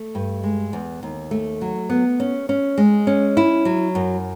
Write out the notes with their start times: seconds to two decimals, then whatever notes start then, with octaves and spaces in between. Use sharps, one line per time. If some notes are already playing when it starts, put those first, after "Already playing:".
Already playing: A3
0.15 G2
0.44 G#3
0.73 E2
1.03 D#2
1.31 A3
1.61 F#3
1.89 B3
2.20 C#4
2.49 C#4
2.78 G#3
3.07 C#4
3.37 E4
3.65 F#3
3.95 F#2